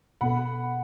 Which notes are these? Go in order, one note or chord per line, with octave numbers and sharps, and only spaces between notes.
B2 B3 A4 F#5 B5